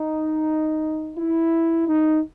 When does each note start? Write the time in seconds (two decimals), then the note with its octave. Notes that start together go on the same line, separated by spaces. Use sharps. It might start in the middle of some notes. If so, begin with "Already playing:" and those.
Already playing: D#4
1.17 E4
1.87 D#4